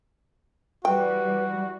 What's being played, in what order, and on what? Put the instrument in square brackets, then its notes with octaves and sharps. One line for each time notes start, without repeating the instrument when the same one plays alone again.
[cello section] E3 G3 [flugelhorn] F#4 [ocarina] B4 [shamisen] G5